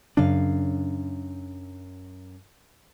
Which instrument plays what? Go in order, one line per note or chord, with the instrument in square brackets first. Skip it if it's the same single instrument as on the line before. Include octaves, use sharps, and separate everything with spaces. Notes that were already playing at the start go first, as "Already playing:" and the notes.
[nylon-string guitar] F#2 F5 [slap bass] C#3 D4